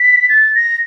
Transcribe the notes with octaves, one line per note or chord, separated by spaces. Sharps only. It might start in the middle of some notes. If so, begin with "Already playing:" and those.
Already playing: B6
A6
A#6